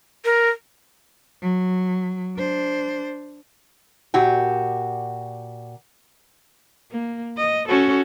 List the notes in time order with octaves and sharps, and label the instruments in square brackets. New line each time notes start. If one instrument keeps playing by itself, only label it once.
[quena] A#4
[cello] F#3
D4 C5
[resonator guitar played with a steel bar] A#2 F#4 G4
[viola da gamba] A#3
D#5
C#4 F#4 A4